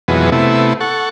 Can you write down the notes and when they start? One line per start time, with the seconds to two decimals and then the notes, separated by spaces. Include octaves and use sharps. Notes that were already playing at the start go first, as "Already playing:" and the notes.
0.08 F2 B2 E3 F#3 G#3 B3
0.32 C3 A3 B3 E4
0.80 A4 F#5 C#6